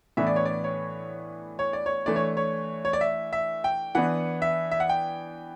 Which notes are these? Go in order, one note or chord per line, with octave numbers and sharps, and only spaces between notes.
A2 E3 B3 D4 E5
D5
C#5
D5
C#5
C#5
D5
C#5
E3 A3 D4 D5
C#5
C#5
C#5
D5
E5
E5
G5
E3 B3 D4 F#5
E5
E5
F#5
G5